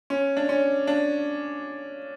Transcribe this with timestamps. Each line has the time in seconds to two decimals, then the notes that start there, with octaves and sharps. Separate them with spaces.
0.10 C#4
0.37 D4
0.49 C#4
0.87 D4